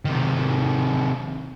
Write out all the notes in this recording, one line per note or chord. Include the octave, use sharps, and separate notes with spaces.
C3 D#3